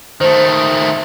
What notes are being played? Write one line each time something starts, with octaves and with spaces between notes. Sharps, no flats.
D#3 A3 C5